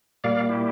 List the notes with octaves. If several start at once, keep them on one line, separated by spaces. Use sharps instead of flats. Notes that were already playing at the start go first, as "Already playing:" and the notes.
A#2 G3 A#3 D5 F5
E4 G4